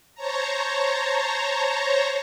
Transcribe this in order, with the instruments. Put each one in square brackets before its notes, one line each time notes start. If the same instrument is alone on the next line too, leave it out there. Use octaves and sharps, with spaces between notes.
[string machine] C5 C#5 A5 A#5